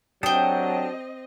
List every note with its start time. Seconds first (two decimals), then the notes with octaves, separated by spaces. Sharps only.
0.23 F#3 C4 D4 G4 A4 D#5 G5 D#6